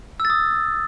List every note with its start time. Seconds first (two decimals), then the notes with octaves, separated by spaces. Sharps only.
0.20 E6
0.25 A6
0.30 D#6